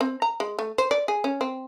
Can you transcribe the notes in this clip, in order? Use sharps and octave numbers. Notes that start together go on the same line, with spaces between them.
C4
A#5
G#3
A3
C5
D5
G#4
C#4
C4